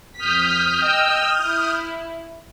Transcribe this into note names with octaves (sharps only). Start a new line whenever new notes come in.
F2 D#6 F6 G6 B6
D#5 G5 E6
E4